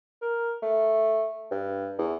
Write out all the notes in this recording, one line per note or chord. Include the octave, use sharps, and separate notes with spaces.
A#4
A3
G2
E2